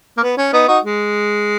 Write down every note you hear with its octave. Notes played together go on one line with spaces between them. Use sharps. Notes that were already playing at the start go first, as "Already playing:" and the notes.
A#3
B3
C#4
B3 D#4
D#4 F#4
G#3